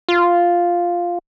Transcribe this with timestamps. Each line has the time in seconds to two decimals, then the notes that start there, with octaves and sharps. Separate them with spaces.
0.09 F4